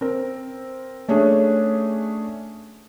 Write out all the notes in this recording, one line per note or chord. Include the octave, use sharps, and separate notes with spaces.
C4 A#4
A3 C#4 D4 G#4